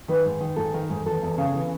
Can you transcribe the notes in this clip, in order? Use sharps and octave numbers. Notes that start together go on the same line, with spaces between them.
D#3 B4
G#2
D#3
G#2 A4
D#3
G#2
E2 A4
E2
C#3
E3